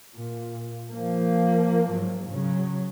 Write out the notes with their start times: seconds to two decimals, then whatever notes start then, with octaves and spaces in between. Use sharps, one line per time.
0.16 A#2
0.93 F3 A#3
1.90 G#2 F#3
2.30 C#3 F#3